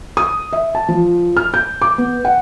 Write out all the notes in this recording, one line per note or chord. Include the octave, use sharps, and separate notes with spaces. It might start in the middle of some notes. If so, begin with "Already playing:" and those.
D#6
E5
A5
F3
F6
G6
D6
B3
F#5